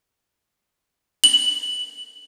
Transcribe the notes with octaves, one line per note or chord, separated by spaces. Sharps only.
F#7